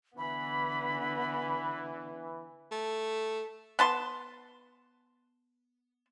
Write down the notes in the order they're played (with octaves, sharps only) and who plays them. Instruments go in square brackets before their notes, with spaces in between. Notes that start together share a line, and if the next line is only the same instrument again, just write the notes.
[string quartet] D3 B3 [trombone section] E3 [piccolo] B5
[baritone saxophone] A3
[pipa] B3 A5 C6